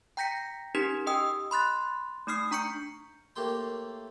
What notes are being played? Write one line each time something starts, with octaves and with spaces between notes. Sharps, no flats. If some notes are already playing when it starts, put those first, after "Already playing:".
G5 A#5 G6 A#6 B6 C#7
C#4 D#4 G4 A#4 G#6 B6
G4 D#5 G5 D#6 E6
B5 C6 F#6 A6
A3 D#4 D#6 F6 C7
D4 A#5 C#6 G6 C#7
A2 A3 A#3 G4 G5 C6